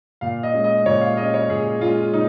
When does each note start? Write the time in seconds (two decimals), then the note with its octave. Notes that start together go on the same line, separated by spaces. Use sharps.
0.21 A#2 F5
0.43 D#5
0.54 G#3 C#4
0.64 D#5
0.86 A#2 C#5
1.01 F5
1.17 G#3 C#4 D#5
1.34 C#5
1.49 A#2 G#4
1.81 G#3 C#4 F4
2.13 A#2 D#4